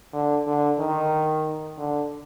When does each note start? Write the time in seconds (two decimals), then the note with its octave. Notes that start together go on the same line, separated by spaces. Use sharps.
0.13 D3
0.47 D3
0.79 D#3
1.78 D3